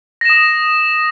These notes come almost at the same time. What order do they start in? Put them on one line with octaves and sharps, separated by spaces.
A#6 E7 D#6